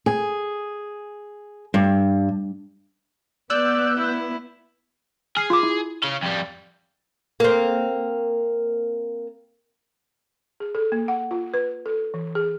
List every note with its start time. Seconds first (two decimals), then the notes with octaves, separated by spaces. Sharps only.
0.06 G#4
1.74 G2
3.50 B3 D5 E6 F#6 G6
3.98 E4
5.37 G#4 F6 C7
5.50 F4 D6
5.63 E4
6.03 C#4 F5
6.23 F2 G3
7.40 A#3 C4
10.60 G#4
10.75 A4
10.92 A#3
11.08 F#5
11.31 F4
11.54 B4
11.86 A4
12.14 E3
12.35 G#4